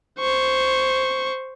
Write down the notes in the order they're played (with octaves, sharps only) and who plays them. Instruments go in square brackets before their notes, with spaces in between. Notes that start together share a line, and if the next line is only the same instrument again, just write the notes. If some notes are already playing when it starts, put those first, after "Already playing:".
[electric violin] C5 C#6